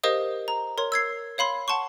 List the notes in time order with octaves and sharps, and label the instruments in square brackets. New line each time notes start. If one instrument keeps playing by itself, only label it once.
[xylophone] G4 A#4 C5 D#5 F5 D#6
A#5
A#4 C#5 C6
E6 G#6 C7
C#5 F5 B5 C6
F#5 A5 C6 C#6